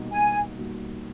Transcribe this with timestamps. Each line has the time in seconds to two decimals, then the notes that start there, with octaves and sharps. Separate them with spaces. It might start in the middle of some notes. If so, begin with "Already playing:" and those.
Already playing: B2 G3 A#3 D#4 F#4
0.11 B2 G#5
0.58 G3 A#3 D#4 F#4